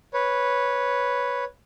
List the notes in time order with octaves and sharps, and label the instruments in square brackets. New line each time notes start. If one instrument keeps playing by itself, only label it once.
[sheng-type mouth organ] B4 C#5